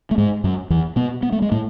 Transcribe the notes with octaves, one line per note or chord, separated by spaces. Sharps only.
A3
G#2 G#3
F#2 F#3
E2 E3
B2 B3
B3
A3
G#3
A2 A3